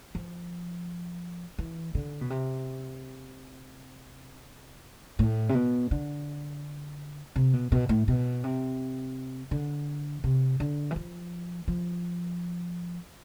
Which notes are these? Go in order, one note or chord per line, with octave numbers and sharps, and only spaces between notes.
F3
E3
D3
B2
C3
A2
C3
B2
D3
C3
B2
B2
A2
B2
C3
D3
C3
D3
E3
F3
F3